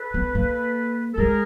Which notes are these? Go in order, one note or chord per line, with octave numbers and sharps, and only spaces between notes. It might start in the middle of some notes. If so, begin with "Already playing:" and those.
Already playing: A4 B4
B3
A#3
A4
G#3 G#4 A#4